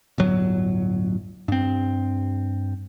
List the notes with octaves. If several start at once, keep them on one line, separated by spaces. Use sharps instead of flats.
D1 G1 F#3
G2 C4